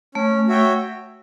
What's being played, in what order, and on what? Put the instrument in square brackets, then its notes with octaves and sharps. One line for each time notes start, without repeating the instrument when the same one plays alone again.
[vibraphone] A3 [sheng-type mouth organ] C#4
[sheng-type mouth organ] F#4 C#5 E5 G5